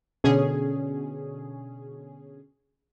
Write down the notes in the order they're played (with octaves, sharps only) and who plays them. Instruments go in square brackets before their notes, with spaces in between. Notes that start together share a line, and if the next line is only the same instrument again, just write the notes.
[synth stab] B2 D3 C#4 G#4